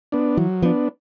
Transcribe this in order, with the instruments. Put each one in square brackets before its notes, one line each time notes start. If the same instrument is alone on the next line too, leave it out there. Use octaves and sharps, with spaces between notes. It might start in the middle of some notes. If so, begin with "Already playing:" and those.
[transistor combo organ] B3 D4
[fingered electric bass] E3 [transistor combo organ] F#3
[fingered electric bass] F3 [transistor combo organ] B3 D4